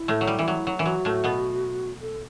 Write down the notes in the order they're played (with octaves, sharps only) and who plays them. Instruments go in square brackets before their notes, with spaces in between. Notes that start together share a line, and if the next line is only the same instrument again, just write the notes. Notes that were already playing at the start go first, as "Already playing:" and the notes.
Already playing: [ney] E4
[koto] A2 A3
F#3
G3
E3
F#3
F#3
[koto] E3 [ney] E4
[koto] F#3 [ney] F#4
[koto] A2 A3
B2 B3
[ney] A4